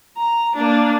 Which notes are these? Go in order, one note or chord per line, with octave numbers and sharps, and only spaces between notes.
A#5
A#3 D4